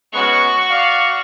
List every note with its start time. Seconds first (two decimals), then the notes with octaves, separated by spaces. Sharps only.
0.13 G#3 B3 C#4 F#4 C#6
0.71 D5 F5